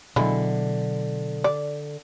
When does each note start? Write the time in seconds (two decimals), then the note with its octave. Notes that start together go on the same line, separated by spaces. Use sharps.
0.16 B2 D3 E3 F#3 G#3 E4
1.44 D5